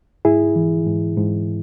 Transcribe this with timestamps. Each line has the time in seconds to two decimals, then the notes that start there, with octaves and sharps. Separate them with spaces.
0.25 G#2 E4 G#4
0.56 E3
0.87 G#2
1.17 G#2